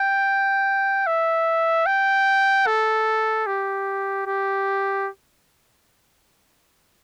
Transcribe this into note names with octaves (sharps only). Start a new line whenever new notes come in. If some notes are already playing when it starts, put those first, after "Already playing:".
Already playing: G5
E5
G5
A4
G4
G4